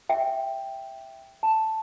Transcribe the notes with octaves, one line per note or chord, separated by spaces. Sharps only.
E5 G5
A5